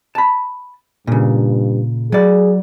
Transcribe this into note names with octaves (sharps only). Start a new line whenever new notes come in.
A5 B5
G2 A#2 C#3
F#3 G#4 D5